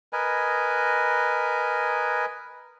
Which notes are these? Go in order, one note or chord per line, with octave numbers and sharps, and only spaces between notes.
A#4 B4 D#5 G#5